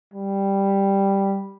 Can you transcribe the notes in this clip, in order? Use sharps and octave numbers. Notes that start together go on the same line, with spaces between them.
G3